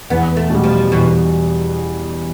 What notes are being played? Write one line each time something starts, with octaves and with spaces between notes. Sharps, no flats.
E2 B3
A3
B2 G3
F3
E2 B2